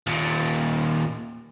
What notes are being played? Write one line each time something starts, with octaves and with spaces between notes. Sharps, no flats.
D#2 A#2